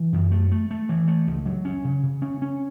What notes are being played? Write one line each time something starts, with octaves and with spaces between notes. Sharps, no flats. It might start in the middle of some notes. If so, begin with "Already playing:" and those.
Already playing: E3
F#2
A3
A3
A3
E3
A3
C#2
F#3
C#4
C#3
C#3
C#4
C#4